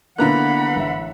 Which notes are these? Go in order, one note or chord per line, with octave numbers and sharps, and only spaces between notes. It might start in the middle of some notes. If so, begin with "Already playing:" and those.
D3 A#3 B3 E4 F#5 A#5 B5 F#6
A1 E5